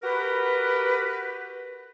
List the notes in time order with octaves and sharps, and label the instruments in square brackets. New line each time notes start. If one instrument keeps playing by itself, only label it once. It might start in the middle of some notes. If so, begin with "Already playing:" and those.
[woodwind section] F#4 G4 A#4 B4